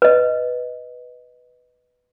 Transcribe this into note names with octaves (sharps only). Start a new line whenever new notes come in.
B4 D#5